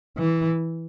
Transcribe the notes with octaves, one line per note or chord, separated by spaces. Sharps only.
E3